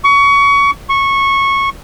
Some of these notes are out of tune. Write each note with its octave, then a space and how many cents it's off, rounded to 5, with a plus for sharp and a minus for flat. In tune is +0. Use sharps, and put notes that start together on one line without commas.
C#6 +25
C#6 -15